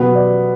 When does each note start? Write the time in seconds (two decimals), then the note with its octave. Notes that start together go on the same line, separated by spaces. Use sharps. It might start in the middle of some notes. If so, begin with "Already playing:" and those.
Already playing: B2 F#3 B3
0.15 D5